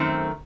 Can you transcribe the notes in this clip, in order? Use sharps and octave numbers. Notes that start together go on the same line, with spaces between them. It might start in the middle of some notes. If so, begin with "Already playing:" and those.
Already playing: F#2 D#3 A3 C4